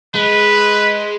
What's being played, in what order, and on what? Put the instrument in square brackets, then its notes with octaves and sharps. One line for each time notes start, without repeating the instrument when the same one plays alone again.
[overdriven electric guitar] G#3 [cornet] B4